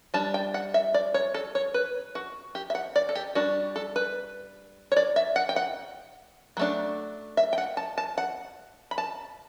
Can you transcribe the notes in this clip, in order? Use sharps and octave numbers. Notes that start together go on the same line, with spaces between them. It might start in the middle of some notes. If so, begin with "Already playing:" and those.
G3 D4 A5
G5
F#5
E5
D5
C#5
A4
C#5
B4
F#4
G4
E5
F#5
D5
A4
G4
G3 D4 F#4
A4
B4
C#5
D5
E5
F#5
G5
F#5
F#3 A3 D4
E5
G5
F#5
A5
A5
F#5
B5
A5